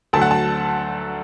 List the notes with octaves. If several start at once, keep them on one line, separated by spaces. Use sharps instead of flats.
D2 D3 F#3 A3 A5
F#5
A5